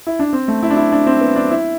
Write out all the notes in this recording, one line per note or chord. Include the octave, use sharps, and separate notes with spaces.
E4
D4
C4
A3
E4
D4
E4
D4
C4
B3
D4
E4